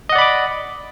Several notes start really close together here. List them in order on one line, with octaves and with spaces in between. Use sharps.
D#5 F#5 D5 B5 D6